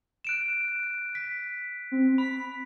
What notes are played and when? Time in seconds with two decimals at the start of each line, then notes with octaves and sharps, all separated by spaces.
0.25 F#6 D7 E7
1.15 B6
1.92 C4
2.18 B5 B6